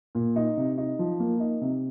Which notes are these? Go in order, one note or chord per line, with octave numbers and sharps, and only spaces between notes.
A#2
D#4
C3
D#4
F3
A#3
D#4
C3